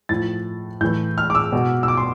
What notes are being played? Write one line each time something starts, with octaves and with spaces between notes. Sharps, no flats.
A2 F3 A6
A2 E3 G6
F6
D6
E6
B2
E6
D6
C6